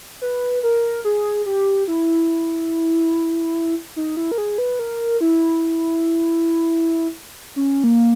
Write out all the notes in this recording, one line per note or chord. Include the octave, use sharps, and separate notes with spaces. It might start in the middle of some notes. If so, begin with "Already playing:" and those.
B4
A#4
G#4
G4
E4
D#4
E4
A#4
G#4
B4
A#4
E4
C#4
A#3